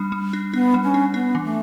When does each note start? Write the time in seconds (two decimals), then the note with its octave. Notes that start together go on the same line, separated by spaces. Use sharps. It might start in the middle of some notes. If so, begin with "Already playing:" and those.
Already playing: G3 D4
0.12 G3
0.33 D4
0.53 B3 D4
0.74 G3
0.84 C#4
0.94 D4
1.14 B3 D4
1.35 E3
1.45 A3